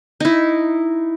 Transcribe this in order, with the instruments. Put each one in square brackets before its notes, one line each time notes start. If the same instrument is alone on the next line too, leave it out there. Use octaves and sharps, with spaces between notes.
[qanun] D#4 E4